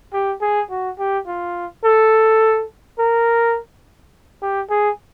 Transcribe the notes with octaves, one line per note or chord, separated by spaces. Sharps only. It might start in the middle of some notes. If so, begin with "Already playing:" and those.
G4
G#4
F#4
G4
F4
A4
A#4
G4
G#4